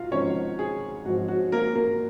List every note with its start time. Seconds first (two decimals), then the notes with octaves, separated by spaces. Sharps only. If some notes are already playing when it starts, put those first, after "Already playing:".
Already playing: G#2 F4 F#4 F5
0.11 G#1 G#2 F3 C#4 C#5
0.59 G#4
1.05 G#1 G#2 F3 F#4
1.28 F#4
1.52 A#3 A#4
1.75 A#3 A#4